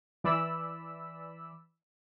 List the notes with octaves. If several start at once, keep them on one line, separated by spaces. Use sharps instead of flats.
E3 D5 B5 E6